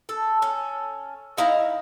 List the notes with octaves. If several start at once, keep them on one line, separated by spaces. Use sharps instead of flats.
A4
C#4 A4
D#4 E4 F5 A#5